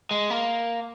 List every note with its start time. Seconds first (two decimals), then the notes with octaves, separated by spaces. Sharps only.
0.11 G#3
0.30 A#3